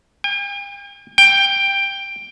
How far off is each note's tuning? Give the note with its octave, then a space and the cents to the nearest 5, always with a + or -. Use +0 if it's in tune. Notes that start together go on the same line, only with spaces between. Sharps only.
G5 +45
G5 +10